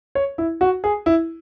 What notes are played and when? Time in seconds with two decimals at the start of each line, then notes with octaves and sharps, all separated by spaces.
0.15 C#5
0.38 E4
0.61 F#4
0.84 G#4
1.06 E4